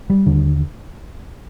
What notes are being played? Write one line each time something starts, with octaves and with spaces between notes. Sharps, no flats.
G3
D#2 D3